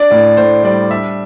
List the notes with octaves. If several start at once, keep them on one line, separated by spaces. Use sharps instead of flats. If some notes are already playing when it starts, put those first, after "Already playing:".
Already playing: D4 D5
A2 D5
A2 C5
G3 D5
D4 E5